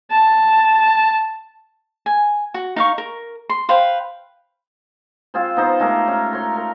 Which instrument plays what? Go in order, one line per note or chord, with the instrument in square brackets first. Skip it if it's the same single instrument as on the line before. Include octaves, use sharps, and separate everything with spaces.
[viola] A5
[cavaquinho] G#5
F#4
D#4 F5 C#6
A#4
C6
B4 C5 F5 G5
[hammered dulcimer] C4 F4 G#4 C5
B3 D#4 C5
G#3 A3 G4 A#4
C#4 D#4
C#5 C6
A#4